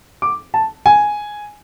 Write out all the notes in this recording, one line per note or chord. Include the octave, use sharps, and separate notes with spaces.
D6
A5
G#5